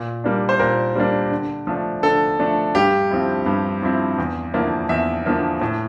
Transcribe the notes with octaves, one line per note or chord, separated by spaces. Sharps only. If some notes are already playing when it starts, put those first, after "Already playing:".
Already playing: A#2
G3 A#3 D4
C5
A#2 A#4
G3 A#3 D4
D3
F3 A3 D4
D3 A4
F3 A3 D4
G2 G4
F3 C4 E4
G2
F3 C4 E4
E2
D3 F3 A#3 E4
E2 E5
D3 F3 A#3 E4
A2